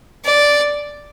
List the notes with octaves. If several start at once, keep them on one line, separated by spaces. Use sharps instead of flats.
D5